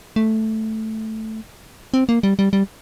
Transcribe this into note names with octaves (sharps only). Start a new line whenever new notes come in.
A3
C4
A#3
G3
G3
G3